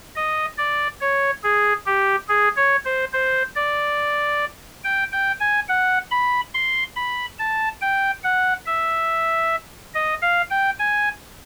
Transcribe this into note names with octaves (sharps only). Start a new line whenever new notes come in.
D#5
D5
C#5
G#4
G4
G#4
C#5
C5
C5
D5
G5
G5
G#5
F#5
B5
C6
B5
A5
G5
F#5
E5
D#5
F5
G5
G#5